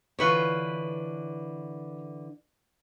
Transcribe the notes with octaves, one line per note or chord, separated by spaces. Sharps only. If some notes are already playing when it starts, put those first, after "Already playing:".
D3 E3 F4 B4 C#5